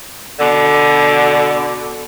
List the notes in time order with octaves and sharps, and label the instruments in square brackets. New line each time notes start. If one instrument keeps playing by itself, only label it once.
[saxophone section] B2 D3